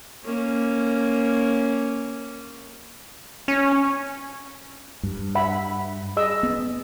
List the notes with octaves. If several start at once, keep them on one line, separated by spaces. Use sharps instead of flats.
A#3 C#4
C#4
G2
E5 F#5 B5
G#4 D#5 E6
B3